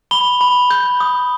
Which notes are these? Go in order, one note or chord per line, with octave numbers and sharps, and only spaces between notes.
B5 G7
B5
G6
D#6